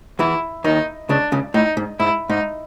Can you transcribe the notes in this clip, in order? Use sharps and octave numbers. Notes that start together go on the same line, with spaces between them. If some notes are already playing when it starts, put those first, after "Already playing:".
E2 E3 E4
D#2 D#3 D#4
C#2 C#3 D4
C#2 C#3
A2 D#4
G#2
G#2 E4
G#2 D#4